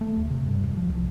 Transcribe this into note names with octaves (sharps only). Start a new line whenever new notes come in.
A3
D#2
C3
G2
E1
F3
C2